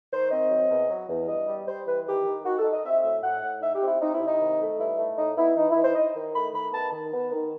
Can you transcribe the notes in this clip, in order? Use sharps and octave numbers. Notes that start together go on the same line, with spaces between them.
D#3 C5
C4 D#5
F#3
E2
F#3
E2
G2 D#5
G3
G3 C5
E3 B4
D#3 G4
D#3
D#3 F#4
A4
D#4
D#5
C4 E5
A2 E5
A2 F#5
A2
D#4 E5
G4
C4
E4
C4 D#4
E4
C3
D#4
D#3
A3
G2 E4
A3
A2 D#4
B3 E4
E3 D#4
E4
E3
C5
D#4 D#5
D#3
A3 B5
D#3 B5
B3 A5
D#3
B3
D#3